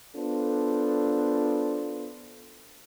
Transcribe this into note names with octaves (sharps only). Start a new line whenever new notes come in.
B3 D4 F4 A4 C5